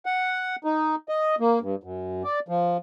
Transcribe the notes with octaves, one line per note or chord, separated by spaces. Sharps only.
F#5
D#4
D#5
A#3
G2
F#2
D5
F3